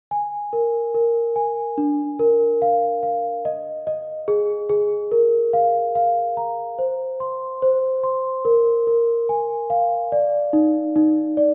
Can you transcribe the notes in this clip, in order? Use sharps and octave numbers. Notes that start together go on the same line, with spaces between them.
G#5
A#4
A#4
G#5
D4
A#4
F5
F5
D#5
D#5
G#4
G#4
A#4
F5
F5
A#5
C5
C6
C5
C6
A#4
A#4
G#5
F5
D5
D#4
D#4
D5